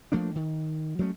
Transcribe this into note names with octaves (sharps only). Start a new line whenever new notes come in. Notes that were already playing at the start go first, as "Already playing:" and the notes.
F3 A3 A#3 D4
D#3
F#3 G#3 A3 C#4